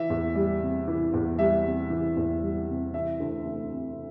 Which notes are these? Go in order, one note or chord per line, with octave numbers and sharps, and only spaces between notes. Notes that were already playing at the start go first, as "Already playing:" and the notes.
Already playing: E3 E5
E2
G3
C3
E3
E2
G3 E5
C3
E3
E2
G3
C3
E3 E5
D2
D2
C3